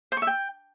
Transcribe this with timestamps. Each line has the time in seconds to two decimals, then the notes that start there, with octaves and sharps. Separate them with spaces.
0.12 C5
0.17 C#6
0.22 E5
0.27 G5